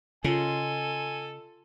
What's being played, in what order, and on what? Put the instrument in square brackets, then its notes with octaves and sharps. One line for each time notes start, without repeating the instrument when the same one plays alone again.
[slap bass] C#3 [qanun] F4 D#5 [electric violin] A4 [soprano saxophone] G#5